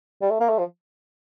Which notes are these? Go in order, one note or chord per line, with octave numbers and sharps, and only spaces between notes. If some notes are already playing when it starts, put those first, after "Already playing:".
G3
A3
A#3
A3
F3